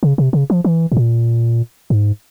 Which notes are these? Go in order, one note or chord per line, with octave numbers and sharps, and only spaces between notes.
C#3
C3
C#3
F3
E3
A2
A#2
G#2